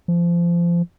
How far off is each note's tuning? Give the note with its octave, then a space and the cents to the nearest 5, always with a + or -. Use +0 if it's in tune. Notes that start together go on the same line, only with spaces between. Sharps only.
F3 -25